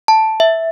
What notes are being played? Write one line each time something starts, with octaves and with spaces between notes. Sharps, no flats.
A5
E5